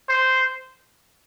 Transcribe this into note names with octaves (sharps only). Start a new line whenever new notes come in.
C5